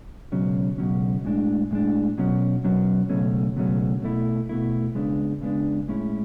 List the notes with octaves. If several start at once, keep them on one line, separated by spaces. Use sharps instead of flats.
C#2 B2 F#3 C#4
C#2 B2 F#3 C#4
A2 G#3 D4
A2 G#3 D4
B2 F#3 C#4
B2 F#3 C#4
C#2 B2 F#3 A3 C#4
C#2 B2 F#3 A3 C#4
B2 A3 E4
B2 A3 E4
C#3 G#3 B3 D4
C#3 G#3 B3 D4
A2 G#3 C#4 E4